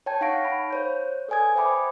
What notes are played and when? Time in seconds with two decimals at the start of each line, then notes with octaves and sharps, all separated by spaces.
0.06 C#5 G5 A5 G#6
0.21 D#4 F5 F#5 C#6 A#6 D7
0.45 B5
0.70 C5 C#5 G6
1.28 A4 B4 D5 G#5 D#6 G#6
1.56 C5 E5 G5 B5 D6